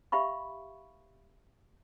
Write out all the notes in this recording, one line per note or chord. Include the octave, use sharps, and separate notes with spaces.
G4 E5 F5 B5 C#6